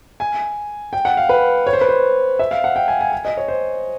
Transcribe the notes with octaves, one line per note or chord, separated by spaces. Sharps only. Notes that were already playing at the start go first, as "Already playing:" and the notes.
G#5
G5
F#5
F5
B4
C#5
C5
B4
C5
E5
F5
F#5
G5
G#5
G#5
G#5
D#5
C#5
C5